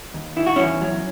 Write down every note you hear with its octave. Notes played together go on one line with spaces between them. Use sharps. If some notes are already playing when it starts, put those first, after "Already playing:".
D#2
D#3 E4
F#4
E2 C#4 E4
F#3